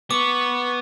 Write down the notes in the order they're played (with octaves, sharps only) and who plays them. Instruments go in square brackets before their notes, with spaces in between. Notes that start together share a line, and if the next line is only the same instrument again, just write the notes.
[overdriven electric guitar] B3 [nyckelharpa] C#6 [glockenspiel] D6